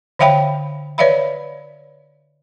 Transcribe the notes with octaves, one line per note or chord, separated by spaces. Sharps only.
D3 C#5 E5 F5 G5 B5
B4 C#5 D5 E5 F5 B5